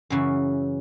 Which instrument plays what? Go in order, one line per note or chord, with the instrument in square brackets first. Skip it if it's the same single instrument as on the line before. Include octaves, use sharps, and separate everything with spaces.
[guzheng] F#2 C#3 E3